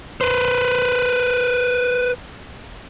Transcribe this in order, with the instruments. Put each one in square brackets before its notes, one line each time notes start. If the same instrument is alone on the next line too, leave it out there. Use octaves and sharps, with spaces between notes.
[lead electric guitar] B4 C5